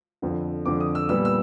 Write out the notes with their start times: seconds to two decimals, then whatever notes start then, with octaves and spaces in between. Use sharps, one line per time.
0.22 F2 D3 F3
0.65 F2 D3 F3 D6
0.80 D#6
0.95 E6
1.09 A#2 G3 B3 E6
1.25 E6